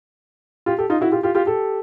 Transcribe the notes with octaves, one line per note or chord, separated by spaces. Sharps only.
F4 G4
G4 A4
D#4 F4
E4 F#4
F4 G4
F4 G4
F4 G4
G4 A4